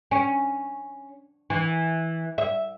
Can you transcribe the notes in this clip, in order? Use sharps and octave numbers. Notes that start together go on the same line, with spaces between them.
C#4
E3
E5